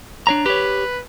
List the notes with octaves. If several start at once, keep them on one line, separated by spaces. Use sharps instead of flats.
D4 C#5 A#5
G4 B4 C#5